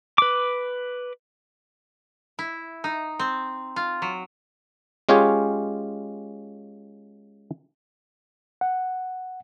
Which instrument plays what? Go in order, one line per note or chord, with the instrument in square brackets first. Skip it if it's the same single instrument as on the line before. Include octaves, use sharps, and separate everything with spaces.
[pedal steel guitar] B4 D6
[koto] E4
D#4
C4
F4
F#3
[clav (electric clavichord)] G#3 C#4 F4 G4 G#4 C#5
[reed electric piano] F#5